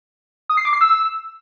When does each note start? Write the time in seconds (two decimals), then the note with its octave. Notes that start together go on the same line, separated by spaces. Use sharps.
0.49 D#6
0.57 C7
0.65 D6
0.73 C7
0.81 E6